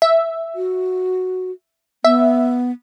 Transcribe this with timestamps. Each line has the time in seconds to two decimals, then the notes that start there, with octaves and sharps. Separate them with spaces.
0.02 E5
0.55 F#4
2.04 B3 E5